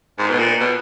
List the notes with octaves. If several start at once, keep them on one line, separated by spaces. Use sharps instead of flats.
G#2
B2
A#2
B2